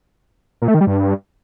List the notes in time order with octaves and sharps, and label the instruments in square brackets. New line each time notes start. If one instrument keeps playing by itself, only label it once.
[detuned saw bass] A#2
A3
D#3
G3
G2